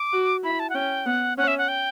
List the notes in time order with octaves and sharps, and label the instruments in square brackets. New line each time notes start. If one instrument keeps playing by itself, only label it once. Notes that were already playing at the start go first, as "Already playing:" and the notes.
Already playing: [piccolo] D6
[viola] F#4
[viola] E4 [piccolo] B5
[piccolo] A5
F#5
[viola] C#4 [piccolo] G5
[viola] B3 [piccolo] F#5
[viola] C#4 [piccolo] F#5
[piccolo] E5
F#5
G5